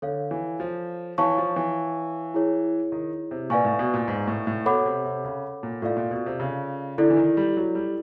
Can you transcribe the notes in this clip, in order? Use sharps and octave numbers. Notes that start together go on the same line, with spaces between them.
D3 A4 C#5 F5
E3
F3
E3 C#5 F5 A5 C#6
F3
E3
E4 G#4 C#5
D#3
C3
A#2 B4 D5 F5 G#5 C#6
A2
B2
A#2
G#2
A2
A2
B2 A4 C#5 F#5 B5 D6
C3
C3
C#3
A#2
A2 F4 A4 D5 F5
A#2
B2
C3
C#3
D3 E4 A4 D5
E3
D#3
G3
F#3
G3